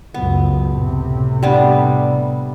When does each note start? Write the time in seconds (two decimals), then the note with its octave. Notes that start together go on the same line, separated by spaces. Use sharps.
0.14 C#2 F#2 B3
0.75 A2 C3
1.43 G3 B3 D4